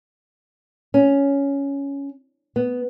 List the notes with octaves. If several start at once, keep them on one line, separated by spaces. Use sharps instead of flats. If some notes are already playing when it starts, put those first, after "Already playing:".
C#4
B3